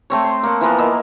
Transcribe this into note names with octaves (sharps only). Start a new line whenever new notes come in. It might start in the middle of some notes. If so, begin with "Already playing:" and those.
A3 C4 C#5
C6
A#3 F#5
E3 F3 A#3 B3
A#3 A#4 D#5 E5